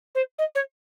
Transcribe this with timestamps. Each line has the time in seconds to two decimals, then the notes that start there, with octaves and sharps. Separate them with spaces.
0.15 C5
0.39 D#5
0.55 C#5